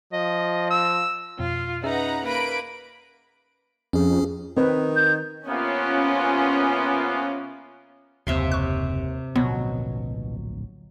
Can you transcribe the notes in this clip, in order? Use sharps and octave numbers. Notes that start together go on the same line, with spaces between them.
F3 D#5
E6
F2 B2 F4
C#4 D#4 G#4 B4 E5 F#5 A#5
A#3 B4 B5 A#6 D7
F2 C#4 G#4
D#3 C4 B4
G6
C3 A#3 B3 C#4 F4
F#1 D#2 C3 E5 C6
C#6 F#6
D1 A#1 B2 F#3 B3 C4